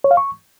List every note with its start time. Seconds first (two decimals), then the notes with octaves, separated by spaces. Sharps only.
0.04 C#5
0.11 F5
0.17 C#6